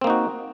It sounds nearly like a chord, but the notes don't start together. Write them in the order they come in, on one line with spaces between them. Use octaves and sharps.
C4 A#3 D#4 F#4